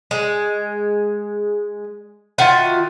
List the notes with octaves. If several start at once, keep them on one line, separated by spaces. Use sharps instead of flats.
G#3
D#3 F4 F#4 E5